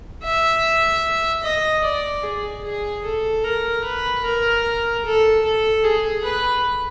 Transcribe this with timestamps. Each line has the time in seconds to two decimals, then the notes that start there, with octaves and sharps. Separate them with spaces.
0.24 E5
1.44 D#5
1.84 D5
2.23 G#4
2.64 G#4
3.05 A4
3.44 A#4
3.84 B4
4.24 A#4
5.05 A4
5.45 A4
5.84 G#4
6.24 B4